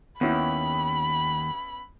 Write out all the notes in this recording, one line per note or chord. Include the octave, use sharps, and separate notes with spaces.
D#2 B3 C#4 E4 B5